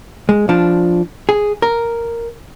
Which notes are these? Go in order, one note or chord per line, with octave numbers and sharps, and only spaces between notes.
G#3
F3 D4
G#4
A#4